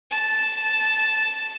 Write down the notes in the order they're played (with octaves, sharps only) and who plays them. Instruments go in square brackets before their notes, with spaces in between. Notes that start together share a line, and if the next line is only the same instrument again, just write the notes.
[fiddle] A5